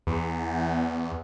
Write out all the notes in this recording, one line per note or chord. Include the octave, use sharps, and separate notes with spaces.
E2